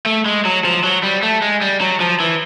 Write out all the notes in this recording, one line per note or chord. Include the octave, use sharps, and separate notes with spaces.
A3
G#3
F#3
F3
F#3
G3
A3
G#3
G3
F#3
F3
E3